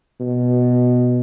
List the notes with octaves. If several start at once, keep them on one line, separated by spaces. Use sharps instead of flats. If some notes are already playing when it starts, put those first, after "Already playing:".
B2